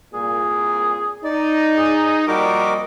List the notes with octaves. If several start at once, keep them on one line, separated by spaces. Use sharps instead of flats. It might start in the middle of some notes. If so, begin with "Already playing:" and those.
C2 A#2 G#4
D#4 D5
G#4
F2 A#2 G3 F#4 A#4 D#5 D6